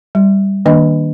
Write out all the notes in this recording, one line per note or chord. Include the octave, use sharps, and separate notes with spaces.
G3
D#3 A#3 D4 D#5